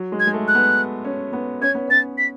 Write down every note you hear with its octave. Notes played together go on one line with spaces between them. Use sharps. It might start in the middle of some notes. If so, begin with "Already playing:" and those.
Already playing: F#3
G#3
G#6
G#3
A3
F#6
B3
C#4
B3
C#4 G#6
B3
C#4 A6
B6